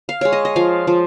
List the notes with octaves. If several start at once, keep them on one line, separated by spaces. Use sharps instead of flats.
F5
G#3 C#5
D#5
D#5
F3 F5
F3